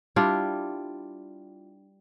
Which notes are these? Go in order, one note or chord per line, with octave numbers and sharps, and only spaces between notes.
G3 D4 E4 F4